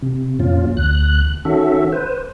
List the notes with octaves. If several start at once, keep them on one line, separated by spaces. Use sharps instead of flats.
C3
F2 A#2 C#4 F4
D2 F#6
D#3 C#4 F#4 A4 E5
B4 C5